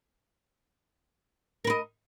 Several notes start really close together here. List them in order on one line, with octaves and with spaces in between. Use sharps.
A#4 B4 D#5